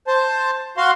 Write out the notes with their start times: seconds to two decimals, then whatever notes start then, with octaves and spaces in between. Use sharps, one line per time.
0.07 C5 A5
0.77 F#4 F5 C6